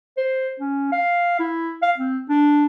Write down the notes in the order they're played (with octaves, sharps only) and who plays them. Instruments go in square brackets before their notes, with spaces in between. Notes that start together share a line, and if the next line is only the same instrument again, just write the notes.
[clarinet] C5
C#4
F5
E4
F5
C4
D4